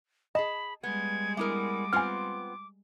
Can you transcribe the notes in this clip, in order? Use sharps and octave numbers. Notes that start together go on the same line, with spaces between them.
G#4 D#5 A5 B5
G3 G#3 B3 G#6
B3 E4 A#4 D6
B3 C4 F4 G#5 F6